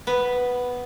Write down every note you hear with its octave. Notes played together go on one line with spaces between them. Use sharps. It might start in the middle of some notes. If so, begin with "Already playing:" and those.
B3 B4